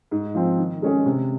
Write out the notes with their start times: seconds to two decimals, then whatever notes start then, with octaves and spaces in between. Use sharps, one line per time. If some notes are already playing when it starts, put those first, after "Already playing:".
0.11 G#2
0.35 F3 C4
0.58 D#3
0.82 G#3 C#4 G#4
1.06 C3